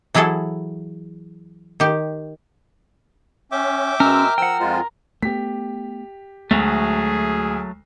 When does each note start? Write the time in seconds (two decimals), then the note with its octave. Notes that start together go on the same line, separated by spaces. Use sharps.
0.14 E3 F#3 E4 G#4 A4
1.80 D#3 G4
3.52 C#4 E5 G5 D6
4.00 B2 G#3 C#4 A#4 E6
4.38 F3 F#5 G5 E6
4.60 F2 G#3 F4 C5
5.22 A3 B3 G4 B6
6.51 D2 F#3 G#3 A3 G#4